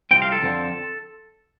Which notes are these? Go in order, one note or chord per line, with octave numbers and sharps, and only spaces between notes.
C2 C3 F3 C4 G5
F5
A4
F2 D3 F3 C4